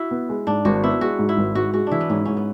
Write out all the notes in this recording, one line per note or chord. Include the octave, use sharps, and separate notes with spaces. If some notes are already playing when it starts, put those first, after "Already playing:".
Already playing: E4 F#4
B3
G#3
G#2 D4
G#1 F#4
B3 E4
G#3 F#4
G#2
E4
G#1
G#2 F#4
G#3 F#4
E3 D4 E4
B3
G#2 C#4
G#2 C#4
B3